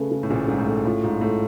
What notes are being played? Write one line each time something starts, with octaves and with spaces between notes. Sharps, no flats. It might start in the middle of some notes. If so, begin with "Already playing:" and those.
Already playing: C#3 A3 B4
C#3
A2
A#1 A#2 C#3
G#2 C#3
A2
A3
A2 F4
G#2 F4
A2 A3